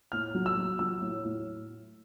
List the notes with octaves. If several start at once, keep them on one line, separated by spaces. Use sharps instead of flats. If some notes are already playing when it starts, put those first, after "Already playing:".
A2 F6
F#3
E6
F#3
F#3 E6
A2
A2